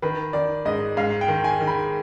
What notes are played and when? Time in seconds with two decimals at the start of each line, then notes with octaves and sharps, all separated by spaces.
0.02 D#3 B4
0.33 D#3 D5
0.65 G#2 D#5
0.97 G#2 F5
1.21 G5
1.28 D#3
1.44 G#5
1.60 D#3
1.67 B5